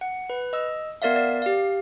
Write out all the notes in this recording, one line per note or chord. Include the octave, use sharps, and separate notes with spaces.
F#5
B4
D#5 E6
B3 A#4 D5 E5 F5
D5
G4 F5